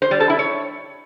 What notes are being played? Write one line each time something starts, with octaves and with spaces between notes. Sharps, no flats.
C5
G3
A4
E4
C#5